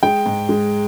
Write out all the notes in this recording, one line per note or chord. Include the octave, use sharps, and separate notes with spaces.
G#3 G5
G#2
G#3